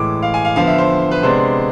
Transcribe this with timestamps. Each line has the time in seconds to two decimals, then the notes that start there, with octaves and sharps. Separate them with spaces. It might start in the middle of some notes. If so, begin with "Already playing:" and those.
Already playing: A2 E3 G#3 D6
0.22 F5
0.34 G#5
0.45 F5
0.56 D3 F3 B3 F5
0.67 E5
0.78 C5
1.11 B4
1.23 C3 G#3 B3 D4 C5